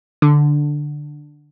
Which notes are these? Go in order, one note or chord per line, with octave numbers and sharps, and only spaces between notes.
D3